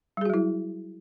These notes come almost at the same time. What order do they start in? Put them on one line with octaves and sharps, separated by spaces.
G3 G#4 F#4 F#3 E4